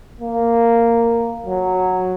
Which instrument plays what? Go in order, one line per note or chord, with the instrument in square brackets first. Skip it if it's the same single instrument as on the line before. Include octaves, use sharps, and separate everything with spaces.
[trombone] A#3
F#3